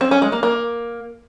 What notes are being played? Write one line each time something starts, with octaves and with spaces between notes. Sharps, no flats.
C4
C#4
G#3
A#3
A#3